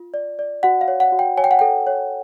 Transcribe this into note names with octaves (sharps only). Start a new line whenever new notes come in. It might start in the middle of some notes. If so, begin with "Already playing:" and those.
Already playing: F4
D5
D5
F#4 F#5
F5
C#5
F#5
F#4
G5
C#5 G#5
G5
F#5
A4 G5
C#5